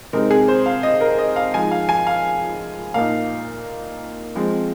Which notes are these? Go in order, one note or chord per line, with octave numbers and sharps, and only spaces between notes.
C3 G#3 C4 D#4 A#4
G#4
C5
F5
D#5
A#4
D#5
F5
F3 G#3 D#4 G#5
F5
G#5
F5
A#2 A#3 D#4 F5
F3 G#3 C4